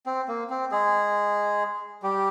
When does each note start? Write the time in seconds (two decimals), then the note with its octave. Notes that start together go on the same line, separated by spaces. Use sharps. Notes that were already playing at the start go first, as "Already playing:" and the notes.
0.06 C4
0.28 A#3
0.50 C4
0.71 G#3 G#4
2.03 G3 G4